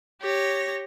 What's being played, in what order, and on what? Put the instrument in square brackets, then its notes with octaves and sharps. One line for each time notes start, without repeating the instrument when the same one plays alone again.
[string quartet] G4 C#5 A#6